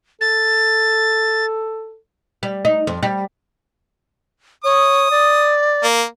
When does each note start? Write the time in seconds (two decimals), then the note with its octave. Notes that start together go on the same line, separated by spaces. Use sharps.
0.21 A4 A6
2.43 G3
2.65 D#4
2.87 F2
3.03 G3
4.64 C#5 D#6
5.11 D5
5.83 A#3